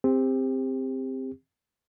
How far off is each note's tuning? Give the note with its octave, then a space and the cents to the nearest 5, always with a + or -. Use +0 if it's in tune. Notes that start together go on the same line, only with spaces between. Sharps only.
C4 +0 G4 +30